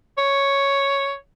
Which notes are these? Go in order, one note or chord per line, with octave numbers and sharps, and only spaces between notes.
C#5